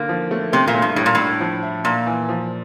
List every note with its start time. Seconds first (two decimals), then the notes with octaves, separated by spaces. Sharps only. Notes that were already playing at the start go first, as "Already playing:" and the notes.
Already playing: D3 A#3
0.09 F3
0.31 A3
0.53 C3 A3
0.68 A#2
0.75 A3
0.82 G2
0.96 A2 G3
1.06 A#2
1.15 A2 D4
1.40 F3
1.63 E4
1.84 A#2 A#3
2.06 E3
2.29 F3